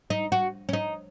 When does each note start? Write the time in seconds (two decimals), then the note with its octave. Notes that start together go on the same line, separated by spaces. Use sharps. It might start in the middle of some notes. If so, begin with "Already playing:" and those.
0.10 D#4
0.32 F#4
0.69 C#4
0.73 D#4